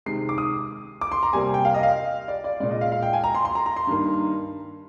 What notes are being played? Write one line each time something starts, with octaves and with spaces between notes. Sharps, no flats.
C3 D#3 G#3 C7
D6
D#6
D6
C6
A#5
C3 G3 A#3 G#5
G5
F5
D#5
F5
D5
D5
A#2 G#3 D5
D#5
F5
F5
G5
G#5
A#5
C6
C6
A#5
A#5
C6
G2 D#3 A#3